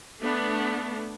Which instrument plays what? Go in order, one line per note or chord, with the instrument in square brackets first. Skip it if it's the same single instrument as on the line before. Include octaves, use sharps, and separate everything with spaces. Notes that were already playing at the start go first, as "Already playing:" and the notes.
[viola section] A3 B3 D4